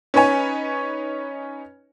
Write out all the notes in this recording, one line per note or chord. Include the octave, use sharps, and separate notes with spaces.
C#4 D#4 B4 C#5 G#5